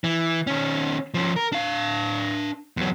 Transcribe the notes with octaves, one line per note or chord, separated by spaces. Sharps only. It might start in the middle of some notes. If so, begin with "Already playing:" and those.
E3
D#3 C#4
F3 C#4
A#4
D4 F5
E2 F#3